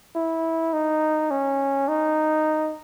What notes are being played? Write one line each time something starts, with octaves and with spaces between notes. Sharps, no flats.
E4
D#4
C#4
D#4